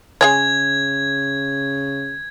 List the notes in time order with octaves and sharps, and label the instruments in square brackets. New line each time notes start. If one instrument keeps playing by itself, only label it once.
[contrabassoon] C#3 [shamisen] G#3 G#4 C#5 [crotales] G#6